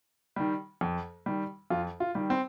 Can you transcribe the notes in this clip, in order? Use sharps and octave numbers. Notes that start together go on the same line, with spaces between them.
D#3 G3
F2
D#3 G3
F2 F4
F4
D#3 G3
C4